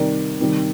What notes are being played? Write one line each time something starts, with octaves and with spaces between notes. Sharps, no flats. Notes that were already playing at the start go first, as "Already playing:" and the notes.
Already playing: C3 D#3 G3 A#4 D5
C3 D#3 G3